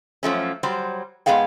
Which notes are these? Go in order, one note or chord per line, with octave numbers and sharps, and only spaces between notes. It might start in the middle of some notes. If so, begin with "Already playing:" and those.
F#2 F3 A3 C#4
F#3 G3 C5
G#2 A#3 B3 G#4 F5 G5